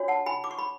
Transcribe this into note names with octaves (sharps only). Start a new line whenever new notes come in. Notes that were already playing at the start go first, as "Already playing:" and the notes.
Already playing: D4 F#4 C#5
F#5 A5
G#5 B5
D6
C#6
B5